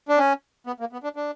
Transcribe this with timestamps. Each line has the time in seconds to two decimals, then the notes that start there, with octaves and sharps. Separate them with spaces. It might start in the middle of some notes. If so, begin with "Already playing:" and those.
0.09 D4
0.18 C#4
0.67 B3
0.80 A#3
0.93 B3
1.04 D4
1.16 D4